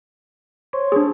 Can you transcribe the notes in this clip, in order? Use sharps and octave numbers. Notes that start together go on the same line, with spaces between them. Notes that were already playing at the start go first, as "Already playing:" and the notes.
C5 C#5
D4 G#4